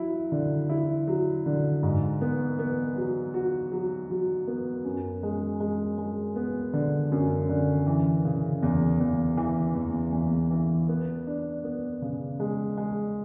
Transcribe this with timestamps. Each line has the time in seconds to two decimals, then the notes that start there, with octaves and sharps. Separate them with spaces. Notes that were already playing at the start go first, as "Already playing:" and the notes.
Already playing: F#3 E4
0.32 D3
0.69 E4
1.07 F#3
1.46 D3
1.83 G#2
2.21 B3
2.59 B3
2.96 F#3
3.34 F#4
3.72 F#3
4.10 F#3
4.48 B3
4.85 F#2
5.23 G#3
5.60 G#3
5.98 G#3
6.36 B3
6.73 D3
7.12 F#2
7.49 D3
7.87 E3
8.25 C#3
8.63 E2
9.00 E2
9.37 E3
9.75 E2
10.13 E2
10.50 E3
10.89 B3
11.27 D4
11.64 B3
12.02 C#3
12.40 G#3
12.77 G#3